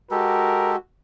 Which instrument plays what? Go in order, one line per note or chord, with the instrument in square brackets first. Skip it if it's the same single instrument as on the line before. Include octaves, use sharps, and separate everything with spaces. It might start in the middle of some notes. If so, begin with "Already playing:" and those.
[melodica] G#3 G4 A4 [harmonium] F#4 [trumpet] A#4